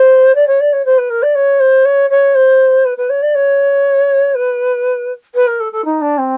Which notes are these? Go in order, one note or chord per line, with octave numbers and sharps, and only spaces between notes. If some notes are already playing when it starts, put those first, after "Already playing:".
Already playing: C5
D5
C#5
D5
C#5
C5
B4
A#4
D5
C#5
C5
C#5
C#5
C5
B4
B4
C#5
D5
C#5
B4
B4
A#4
A4
A4
D#4
D4
C4